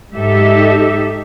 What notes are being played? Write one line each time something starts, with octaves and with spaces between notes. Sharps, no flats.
G#2 D#4 G4 A4 E5